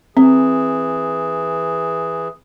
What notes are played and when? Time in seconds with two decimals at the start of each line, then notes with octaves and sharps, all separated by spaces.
0.17 E3 C4 G#4